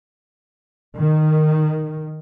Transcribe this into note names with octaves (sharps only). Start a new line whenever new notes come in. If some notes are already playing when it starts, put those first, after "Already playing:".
D#3